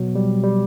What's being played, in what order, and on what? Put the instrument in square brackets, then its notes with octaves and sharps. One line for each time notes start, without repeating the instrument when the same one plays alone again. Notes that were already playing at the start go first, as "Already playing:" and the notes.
Already playing: [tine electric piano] B2 F#3
G3
G3